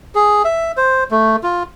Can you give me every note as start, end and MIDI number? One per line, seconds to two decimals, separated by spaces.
0.15 0.43 68
0.45 0.72 76
0.77 1.04 72
1.11 1.36 57
1.43 1.63 65